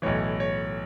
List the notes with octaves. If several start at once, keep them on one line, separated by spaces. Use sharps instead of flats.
B1 A2 E3 C#5
C#5